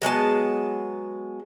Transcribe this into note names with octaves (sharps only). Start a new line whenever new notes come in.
F#3 G#3 B3 A5